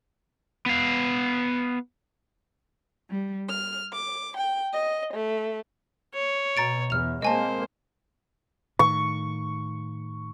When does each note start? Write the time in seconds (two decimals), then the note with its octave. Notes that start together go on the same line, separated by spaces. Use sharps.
0.66 B3 F5
3.09 G3
3.50 F6
3.93 D6
4.37 G5
4.73 D#5
5.13 A3
6.14 C#5
6.57 B2 A#5 A6 D7
6.90 E2 F6 F7
7.22 G#3 A#3 C4 C5 D#5 G#5 A5
8.79 A2 D#3 C#6